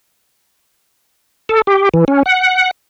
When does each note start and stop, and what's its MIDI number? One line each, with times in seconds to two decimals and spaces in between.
1.49 1.62 69
1.67 1.89 67
1.94 2.05 52
2.08 2.23 61
2.26 2.71 78